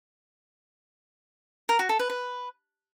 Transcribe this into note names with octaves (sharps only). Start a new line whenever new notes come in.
A#4
F#4
A4
B4
B4